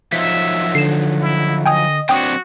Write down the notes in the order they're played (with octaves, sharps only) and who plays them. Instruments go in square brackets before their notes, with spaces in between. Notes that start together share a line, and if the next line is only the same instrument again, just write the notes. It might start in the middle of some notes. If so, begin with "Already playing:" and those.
[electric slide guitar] F3 F#3 D#4 [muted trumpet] E5 [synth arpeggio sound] B6
[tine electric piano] D3 [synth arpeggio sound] C7 E7
[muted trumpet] E4
[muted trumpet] D#5 [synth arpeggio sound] G5 G#5 D#6
[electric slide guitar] F#3 C4 D4 [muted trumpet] F#4 [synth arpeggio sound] G5 D#6